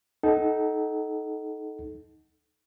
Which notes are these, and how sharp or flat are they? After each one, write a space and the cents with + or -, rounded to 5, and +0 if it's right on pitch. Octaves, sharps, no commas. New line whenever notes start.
D#4 +10 A4 -20 F#5 +25